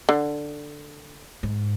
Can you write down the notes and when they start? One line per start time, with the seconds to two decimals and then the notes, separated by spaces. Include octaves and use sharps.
0.09 D3
1.43 G#2